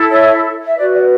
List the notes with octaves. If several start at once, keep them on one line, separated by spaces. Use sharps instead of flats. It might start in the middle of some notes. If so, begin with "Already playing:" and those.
Already playing: E4 A4
C#5 E5
E5
F#4 B4 D5
D5